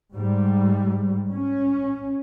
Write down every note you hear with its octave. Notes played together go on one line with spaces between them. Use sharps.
G#2 G3
C#4